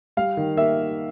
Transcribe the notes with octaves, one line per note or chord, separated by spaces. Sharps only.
G3 F5
D#3
A#3 E5